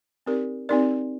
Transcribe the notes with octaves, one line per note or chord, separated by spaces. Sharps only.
C4 D#4 G4 A#4 D5
C4 D#4 G4 A#4 D5